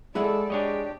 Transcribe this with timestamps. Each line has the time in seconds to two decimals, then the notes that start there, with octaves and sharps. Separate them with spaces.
0.15 G#3 E4 G#4 A4 D5 F#5
0.50 G#3 D4 G4 C#5 D#5